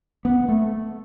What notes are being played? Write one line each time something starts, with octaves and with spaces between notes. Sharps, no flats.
B3
A3